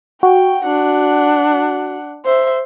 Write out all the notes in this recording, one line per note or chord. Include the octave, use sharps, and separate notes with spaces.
F#4 G5
D4 F#5
C5 E5